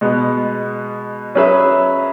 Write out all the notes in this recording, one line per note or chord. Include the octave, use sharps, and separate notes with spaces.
B2 G#3 B3
F#3 C#4 G#4 B4 E5